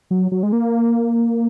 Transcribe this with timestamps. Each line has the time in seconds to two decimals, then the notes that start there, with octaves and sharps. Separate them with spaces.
0.11 F#3
0.32 F#3
0.43 G#3
0.52 A#3